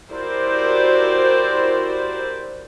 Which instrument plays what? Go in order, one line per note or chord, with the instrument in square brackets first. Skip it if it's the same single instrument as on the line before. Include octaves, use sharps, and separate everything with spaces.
[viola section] E4 F#4 G4 A#4 C5 D5